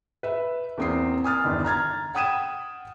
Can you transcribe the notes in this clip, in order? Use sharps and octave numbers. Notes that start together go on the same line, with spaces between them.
B4 E5
E2 A#3 C4 D#6 C7
G#5 D#6 F6 A6
G1 E2 D#3
A#5 F6 G#6 A6
F#5 G5 D#6 G#6 D#7 E7